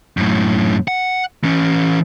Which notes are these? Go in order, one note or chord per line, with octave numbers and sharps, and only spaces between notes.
F#2 A2
F#5
E3 C#4